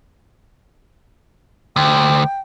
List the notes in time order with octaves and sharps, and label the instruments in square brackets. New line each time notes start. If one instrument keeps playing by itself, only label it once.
[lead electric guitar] D2 [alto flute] G5